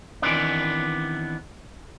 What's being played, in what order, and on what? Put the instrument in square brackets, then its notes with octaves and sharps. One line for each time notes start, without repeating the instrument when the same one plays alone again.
[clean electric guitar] D#3 E3 G3 B3 C4 D4